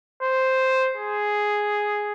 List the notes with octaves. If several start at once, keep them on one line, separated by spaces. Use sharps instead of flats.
C5
G#4